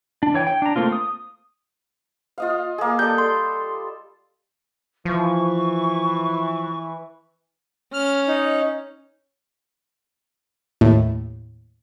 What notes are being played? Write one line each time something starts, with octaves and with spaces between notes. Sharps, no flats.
D4
E3 C#5 G5
G5
D4 A#5
A3 A#3 C4 F4
D#6
F4 D#5 F5
A#3 G#4
G3 A4 G6
C6
E3 F3 C#6
C#4 F6
D#4
D#2 A2